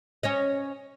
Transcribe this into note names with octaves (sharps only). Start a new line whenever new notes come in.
C#4 C#5 D#5